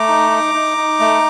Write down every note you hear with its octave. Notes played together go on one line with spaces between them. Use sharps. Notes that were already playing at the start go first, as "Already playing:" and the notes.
Already playing: A3 A#5 D6
D#4
D#4
D#4
D#4
A3